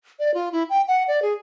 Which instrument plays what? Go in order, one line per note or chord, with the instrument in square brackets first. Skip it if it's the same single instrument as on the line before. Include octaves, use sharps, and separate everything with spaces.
[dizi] D5
F4
E4
G5
F#5
D5
G#4